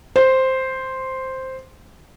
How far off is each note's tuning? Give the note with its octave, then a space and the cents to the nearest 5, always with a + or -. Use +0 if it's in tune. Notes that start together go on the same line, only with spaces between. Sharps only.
C5 +0